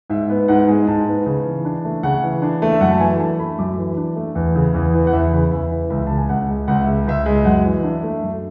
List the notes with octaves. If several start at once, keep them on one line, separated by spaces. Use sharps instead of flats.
G#2 E5
B3
G#2 F#5
G#3
G#2 A5
B3
C#3
E3
D4
A3
C#3 F#5
E3
D4
A3
E5
F#2 F#5
A5
E3 G#5
D4 A5
A3 B5
F#2 D6
E3
D4
A3
E2
C#3
E2
E3
F#5
E2 E5
C#3
E2 E5
E3
C#2 E5
C#3 A5
G#5
C#2 F#5
G#3
C#2 F#5
E5
C#3
C#2 E5
G#3
F#2 F#5
E3
D4 E5
A3
F#2